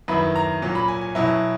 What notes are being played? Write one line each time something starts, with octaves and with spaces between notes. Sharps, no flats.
F#2 D#3 F#3 B3 E4 B5
A#5
A#2 F#3 C#4
B5
G#5
G#5
B2 F#3 C#4 E4